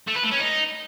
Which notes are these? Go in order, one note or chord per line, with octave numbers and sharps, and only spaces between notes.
A3
B4
A3
C#4
D#4